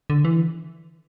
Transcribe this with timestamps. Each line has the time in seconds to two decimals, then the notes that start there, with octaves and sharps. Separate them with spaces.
0.10 D3
0.25 E3